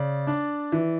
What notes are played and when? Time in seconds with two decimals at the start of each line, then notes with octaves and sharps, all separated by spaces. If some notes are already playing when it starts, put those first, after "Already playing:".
Already playing: C#3 D5
0.27 D4
0.72 E3